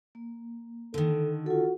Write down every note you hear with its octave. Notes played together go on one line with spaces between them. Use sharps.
A#3
D3 D#3 A4
F4 F#4 A4